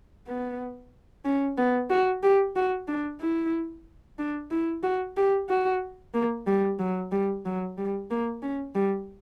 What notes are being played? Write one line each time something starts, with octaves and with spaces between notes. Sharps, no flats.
B3
C#4
B3
F#4
G4
F#4
D4
E4
D4
E4
F#4
G4
F#4
A#3
G3
F#3
G3
F#3
G3
A#3
C#4
G3